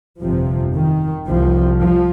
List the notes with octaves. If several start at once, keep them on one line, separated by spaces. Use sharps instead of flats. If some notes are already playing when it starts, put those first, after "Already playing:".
G1 F2 C3 F3
D#3
C2 C3 F3
F3